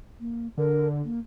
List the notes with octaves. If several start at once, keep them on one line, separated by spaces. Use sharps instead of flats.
A#3
D3 A#4
A#3